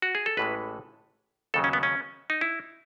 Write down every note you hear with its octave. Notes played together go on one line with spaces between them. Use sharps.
F#4
G#4
A4
A1 A2 E3 G#3 B4
D#2 C#3 F#3 A4
C#4
B3
C#4
D#4
E4